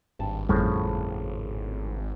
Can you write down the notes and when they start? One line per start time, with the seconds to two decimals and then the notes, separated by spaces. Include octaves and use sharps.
0.19 G#1 G2 A5
0.49 G1 F2 A2 C#3 F3 G3